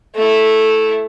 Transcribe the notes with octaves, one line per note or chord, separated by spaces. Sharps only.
A3 E4